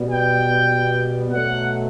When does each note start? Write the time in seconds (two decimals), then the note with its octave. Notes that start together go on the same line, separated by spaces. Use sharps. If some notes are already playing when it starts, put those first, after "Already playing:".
Already playing: B2 G3 B3
0.09 G5
1.31 B2 F#3 A3 F#5